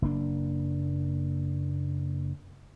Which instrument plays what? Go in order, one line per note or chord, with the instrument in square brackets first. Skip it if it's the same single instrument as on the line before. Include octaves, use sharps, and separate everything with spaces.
[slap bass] F#1 A#3 D4